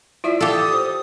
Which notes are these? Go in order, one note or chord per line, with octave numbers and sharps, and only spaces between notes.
E4 F4 D5 E5
G4 A4 F5
D#6
C5